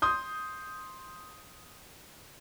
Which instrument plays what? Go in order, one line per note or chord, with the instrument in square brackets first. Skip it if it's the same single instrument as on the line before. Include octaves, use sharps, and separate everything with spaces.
[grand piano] C6 D#6 G6